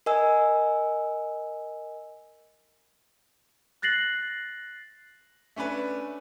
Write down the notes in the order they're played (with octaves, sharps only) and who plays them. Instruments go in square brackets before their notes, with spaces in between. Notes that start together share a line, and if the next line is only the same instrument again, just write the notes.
[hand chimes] A#4 D#5 G#5 E6
[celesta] F#6 A6 A#6 C7 F#7
[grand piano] A3 C#4 D4 B4